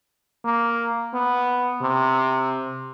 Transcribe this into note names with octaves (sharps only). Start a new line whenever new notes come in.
A#3
B3
C3